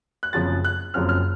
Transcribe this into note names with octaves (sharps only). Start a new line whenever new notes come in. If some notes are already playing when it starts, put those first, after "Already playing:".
F#6
F#1 F#2 C#3 F3 C4 A6
F#6
F#1 F#2 C#3 F3 C4 F6
F6